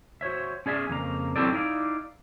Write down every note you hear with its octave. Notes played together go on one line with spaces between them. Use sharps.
F#4 C5 C#5 E5
C#4 G#4 D5 E5
F2 C#3 A#3 A#5
F#3 C4 E4 G4 A4 D5
D#4 E4 D5 F5